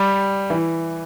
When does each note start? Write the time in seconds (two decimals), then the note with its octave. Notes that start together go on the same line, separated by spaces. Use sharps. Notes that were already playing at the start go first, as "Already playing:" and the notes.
Already playing: G3
0.50 E3